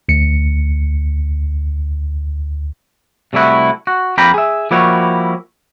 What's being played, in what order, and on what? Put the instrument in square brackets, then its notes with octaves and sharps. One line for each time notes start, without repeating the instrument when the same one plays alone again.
[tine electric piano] D2 C#7
[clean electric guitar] C3 G3 A3 E4 F#4
F#4
F2 A#3 G5 A#5 B5
G#4 E5
F3 G3 A#3 E4 F#4 C#5